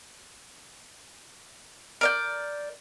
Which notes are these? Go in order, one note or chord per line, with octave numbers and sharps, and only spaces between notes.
A#4 D5 G6